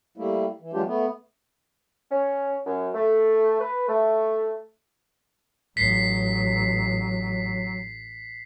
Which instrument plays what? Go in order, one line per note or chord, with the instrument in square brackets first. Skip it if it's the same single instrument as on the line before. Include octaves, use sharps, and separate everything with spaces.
[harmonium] G3 A3 A#3 E4
E3
E3 F#3 G#3 D4 F4 G4
A3 B3
[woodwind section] C#4
F#2
A3
B4
A3
[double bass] A1 [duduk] F#3 [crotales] B6 C7